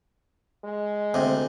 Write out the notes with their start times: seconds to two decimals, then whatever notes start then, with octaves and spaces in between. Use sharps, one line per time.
0.64 G#3
1.14 D2 C3